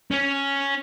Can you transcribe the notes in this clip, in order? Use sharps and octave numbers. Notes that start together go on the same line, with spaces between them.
C#4 C#5